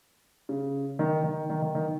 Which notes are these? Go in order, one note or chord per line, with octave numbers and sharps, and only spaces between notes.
C#3
D#3
D#3
D#3
D#3
D#3